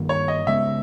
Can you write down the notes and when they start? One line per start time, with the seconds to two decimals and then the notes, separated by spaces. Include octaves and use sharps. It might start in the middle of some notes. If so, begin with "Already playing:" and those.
Already playing: G2 D#3 A#3
0.09 C#5
0.28 D#5
0.47 C#3 G#3 B3 E5